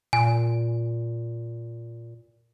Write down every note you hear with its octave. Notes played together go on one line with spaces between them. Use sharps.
A#2 G#5